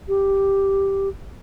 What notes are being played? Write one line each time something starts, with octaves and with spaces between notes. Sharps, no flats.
G4